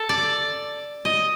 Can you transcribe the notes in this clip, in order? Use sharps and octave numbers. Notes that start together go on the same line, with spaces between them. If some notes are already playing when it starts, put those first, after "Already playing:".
Already playing: A4
D5
D#5